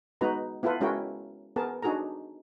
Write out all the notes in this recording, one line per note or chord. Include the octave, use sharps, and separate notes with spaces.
G#3 B3 D#4 F#4 B4 A#5
B3 E4 F4 A4 B4
G#3 C#4 E4 F#4 A#4 G5
B3 G#4 A#4 A5
D4 D#4 F#4 G#4 A4 A#5